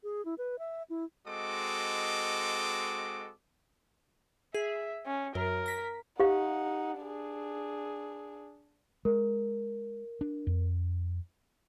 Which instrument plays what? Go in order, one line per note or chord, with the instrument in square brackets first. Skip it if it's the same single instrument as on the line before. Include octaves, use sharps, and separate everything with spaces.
[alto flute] G#4
E4
B4
E5
E4
[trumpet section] G#3 C4 F#4 A4 D#5 D6
[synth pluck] G#4 [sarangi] E5
[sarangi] C#4
[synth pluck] F#2 [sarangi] A#4
[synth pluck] A#6 B6
[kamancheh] D#4 F#5 [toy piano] G4 F5
[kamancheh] D4 G#4
[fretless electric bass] G#3 [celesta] A#4
[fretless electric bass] D4
F2